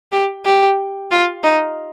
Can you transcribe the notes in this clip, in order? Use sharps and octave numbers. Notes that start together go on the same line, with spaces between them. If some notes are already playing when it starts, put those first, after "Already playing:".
G4
G4
F4
D#4